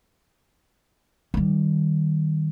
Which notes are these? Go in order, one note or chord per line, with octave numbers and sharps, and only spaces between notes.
D#3 G3